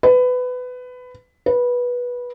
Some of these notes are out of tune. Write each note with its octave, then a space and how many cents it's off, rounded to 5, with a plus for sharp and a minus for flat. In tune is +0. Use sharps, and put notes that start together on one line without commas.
B4 +20
B4 -15